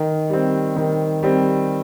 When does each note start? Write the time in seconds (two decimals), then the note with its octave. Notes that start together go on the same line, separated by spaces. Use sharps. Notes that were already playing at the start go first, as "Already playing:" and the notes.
Already playing: D#3
0.29 G3 C4
0.76 D#3
1.23 G3 C4